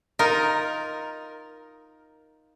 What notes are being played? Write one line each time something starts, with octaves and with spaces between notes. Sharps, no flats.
D#4 F4 A#4